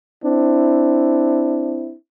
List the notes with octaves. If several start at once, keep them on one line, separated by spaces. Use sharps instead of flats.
C4 D4 E4